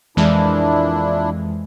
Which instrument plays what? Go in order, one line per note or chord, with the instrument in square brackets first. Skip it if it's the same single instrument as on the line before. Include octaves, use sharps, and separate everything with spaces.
[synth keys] F2 E3 G#3 [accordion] A#2 D4 E4